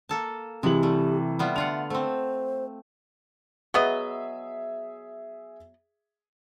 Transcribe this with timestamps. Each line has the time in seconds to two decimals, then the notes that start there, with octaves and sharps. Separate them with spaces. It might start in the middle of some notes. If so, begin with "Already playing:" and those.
0.09 A#3 A4 A5
0.63 C3 E3 G#3 G4 F#7
0.83 G3 A3
1.39 G3 B3 F4 E5
1.56 D3 F4 F#5 F7
1.90 A3 C4 C5
3.74 F#3 B3 G#4 D#5 E5